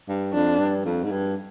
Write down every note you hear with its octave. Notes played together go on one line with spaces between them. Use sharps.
G2
F2 D4
G2
F2
G#2
G2